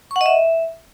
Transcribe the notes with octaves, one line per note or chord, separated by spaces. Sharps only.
C#6
F#5
D#5
E5